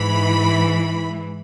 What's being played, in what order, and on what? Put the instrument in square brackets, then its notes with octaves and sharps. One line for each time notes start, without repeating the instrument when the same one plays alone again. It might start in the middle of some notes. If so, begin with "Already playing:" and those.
Already playing: [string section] G#2 E3 B5